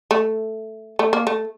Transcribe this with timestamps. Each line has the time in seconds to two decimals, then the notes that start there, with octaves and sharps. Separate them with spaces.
0.11 A3
0.99 A3
1.13 A#3
1.27 A3